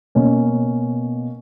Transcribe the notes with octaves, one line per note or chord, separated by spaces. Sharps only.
B2 A#3 C#4